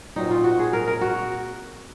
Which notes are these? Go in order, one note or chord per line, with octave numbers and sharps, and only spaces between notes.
A#2 F#3 C4 D#4
F4
F#4
G#4
A#4
A#4
F#4